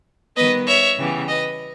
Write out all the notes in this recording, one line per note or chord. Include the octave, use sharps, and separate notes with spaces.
D#3 G3 B3 B4 D#5
C#5 E5
C#3 E3 G3 B3
B4 D#5